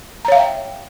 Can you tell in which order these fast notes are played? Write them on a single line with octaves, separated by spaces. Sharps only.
A#5 C#5 F5 E5 G5